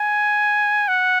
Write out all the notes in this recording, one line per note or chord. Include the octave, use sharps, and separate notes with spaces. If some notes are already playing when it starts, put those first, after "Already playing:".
Already playing: G#5
F#5